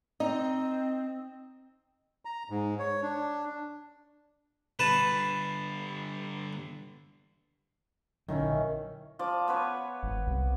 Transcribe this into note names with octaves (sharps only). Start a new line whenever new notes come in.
C4 D#4 D#5
A#5
G#2
C#5
D4
D3 G3 B4 A5
A#1 D3 D#3 F#3 C#4 E4
F3 D5
B3 B4 C#5
G#1
C2